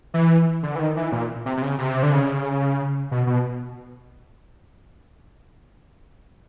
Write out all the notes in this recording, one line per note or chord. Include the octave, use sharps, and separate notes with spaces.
E3
D3
E3
D#3
E3
A#2
C3
C3
C#3
C3
D3
C#3
B2
B2